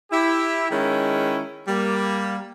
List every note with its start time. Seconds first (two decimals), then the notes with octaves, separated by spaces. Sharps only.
0.11 E4 G4
0.70 D#3 G#3 C#4 E4
1.68 G3 A#3